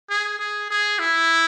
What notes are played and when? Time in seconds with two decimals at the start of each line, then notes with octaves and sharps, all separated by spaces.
0.10 G#4
0.39 G#4
0.70 G#4
0.99 E4